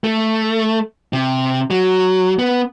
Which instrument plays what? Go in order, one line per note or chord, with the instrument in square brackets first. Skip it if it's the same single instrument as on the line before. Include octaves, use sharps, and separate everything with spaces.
[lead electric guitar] A3
C3
F#3
B3